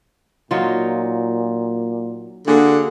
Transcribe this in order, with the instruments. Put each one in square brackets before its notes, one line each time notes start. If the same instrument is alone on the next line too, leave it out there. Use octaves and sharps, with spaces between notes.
[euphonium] A#2 [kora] F#3 D#4 F4
[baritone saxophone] D3 [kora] A#3 F#4 G#4